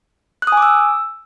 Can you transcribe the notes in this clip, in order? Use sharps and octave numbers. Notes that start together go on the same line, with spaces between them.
F#6
D#6
G#5
D6
E6